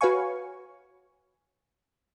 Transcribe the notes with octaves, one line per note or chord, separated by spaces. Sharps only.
F#4 B4 C#5 F5 G#5 C#6